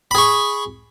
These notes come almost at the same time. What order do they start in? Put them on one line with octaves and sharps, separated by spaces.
B5 G#4 C#6